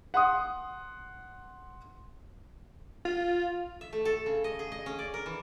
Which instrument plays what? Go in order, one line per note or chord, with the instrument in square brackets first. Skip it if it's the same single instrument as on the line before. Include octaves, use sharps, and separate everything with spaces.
[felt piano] F#5 C6 D#6
[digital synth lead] F4
[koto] E5
A3
A4
C#3
D#5
G#4
D#5
C#4
D5
A#4
E3